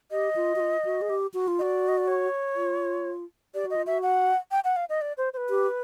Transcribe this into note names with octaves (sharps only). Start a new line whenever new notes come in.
G4 D#5
F4
F#4
F4
F#4
G#4
G4
F#4
F4
F#4 D5 D#5
D#5
D5
C#5
F4
G4 D5
F#4
D#5
F4
F#4 E5
F#5
G5
F#5
F5
D#5
D5
C5
C5
B4
G4